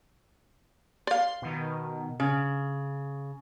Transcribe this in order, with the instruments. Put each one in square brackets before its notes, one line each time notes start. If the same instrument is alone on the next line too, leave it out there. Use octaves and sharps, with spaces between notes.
[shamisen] D5 F5 [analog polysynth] C6
[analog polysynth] B2 D#3
[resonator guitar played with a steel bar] C#3